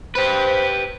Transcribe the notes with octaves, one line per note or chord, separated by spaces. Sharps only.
G4 B4 C5